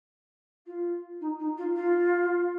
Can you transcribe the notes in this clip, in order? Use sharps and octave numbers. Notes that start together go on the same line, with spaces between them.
F4
D#4
D#4
F4
F4